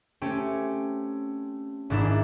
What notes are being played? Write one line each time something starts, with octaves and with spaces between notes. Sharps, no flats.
A3 C4 C#4 G4
G#1 G#2 D4 E4 E7